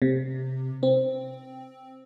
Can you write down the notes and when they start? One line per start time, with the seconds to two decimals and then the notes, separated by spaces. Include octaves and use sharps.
0.02 C3
0.83 C4